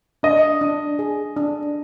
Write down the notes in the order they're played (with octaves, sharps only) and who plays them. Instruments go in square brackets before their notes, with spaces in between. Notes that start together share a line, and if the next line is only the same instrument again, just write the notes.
[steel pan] D4 [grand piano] D#5
[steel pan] D4
G#4
D4